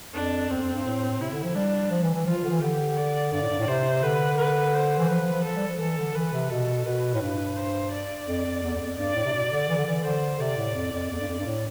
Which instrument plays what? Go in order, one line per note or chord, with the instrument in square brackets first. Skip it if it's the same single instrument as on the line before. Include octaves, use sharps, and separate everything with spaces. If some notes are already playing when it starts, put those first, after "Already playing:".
[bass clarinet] F2 [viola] D4
[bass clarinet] F2 [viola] C4
[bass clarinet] E2
F2
G2
A2
[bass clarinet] C3 [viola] E4
[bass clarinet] D3
F3
[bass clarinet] G3 [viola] D4
[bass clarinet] F3
E3
E3
[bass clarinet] F3 [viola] F4
[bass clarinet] F3
D3
E3
[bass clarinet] D3 [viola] G4
[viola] D5
[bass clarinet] G2 [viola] D5
[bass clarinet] A2
G2
A2
[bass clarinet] C3 [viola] C5
[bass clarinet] D3 [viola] B4
[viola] B4
C5
[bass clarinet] E3
[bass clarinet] F3 [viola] B4
[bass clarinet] F3
F3
[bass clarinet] F3 [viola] A4
[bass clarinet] G3
F3
[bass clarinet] E3 [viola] A4
[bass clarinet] D3
[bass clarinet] E3 [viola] B4
[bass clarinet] C3
[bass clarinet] B2 [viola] A4
[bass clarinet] B2 [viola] B4
[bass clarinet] A2
G2
[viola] C5
D5
[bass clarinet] F2
F2
E2
E2
F2
[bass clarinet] G2 [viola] D5
[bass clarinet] A2
C3
B2
D3
E3
D3
E3
[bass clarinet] D3 [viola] C5
[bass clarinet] C3 [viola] D5
[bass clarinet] A2
F2
F2
[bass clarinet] E2 [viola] D5
[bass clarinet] G2
F2
G2
A2